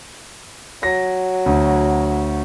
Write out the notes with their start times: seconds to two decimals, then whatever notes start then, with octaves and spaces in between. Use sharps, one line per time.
0.83 F#3 A#6
1.46 D2